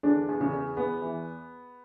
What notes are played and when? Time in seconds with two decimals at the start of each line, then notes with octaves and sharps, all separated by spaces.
0.03 E2 D3 D4
0.29 E2
0.41 C#3 C#4
0.53 E2
0.77 E2 B3
1.01 E3